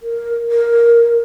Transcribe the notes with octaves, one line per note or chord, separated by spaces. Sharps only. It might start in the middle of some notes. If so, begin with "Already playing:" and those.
A#4
A#4